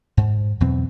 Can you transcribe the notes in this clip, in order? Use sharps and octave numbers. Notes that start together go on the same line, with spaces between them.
G#2
E2 B2 F#3 C4